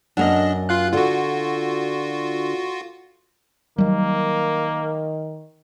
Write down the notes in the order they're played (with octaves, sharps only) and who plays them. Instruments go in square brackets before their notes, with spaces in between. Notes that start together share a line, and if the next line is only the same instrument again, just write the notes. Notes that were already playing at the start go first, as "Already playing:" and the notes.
[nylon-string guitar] F#2 A#3 [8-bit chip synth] D4 D#5
[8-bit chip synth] F4 F5 F#6
[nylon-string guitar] D3 [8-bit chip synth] F4 F#4
[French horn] D#3 [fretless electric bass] F#3 G3 [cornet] A#3